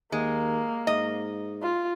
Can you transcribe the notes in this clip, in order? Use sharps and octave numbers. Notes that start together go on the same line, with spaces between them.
D#2 G#3 A#3
G#2 D#5
F4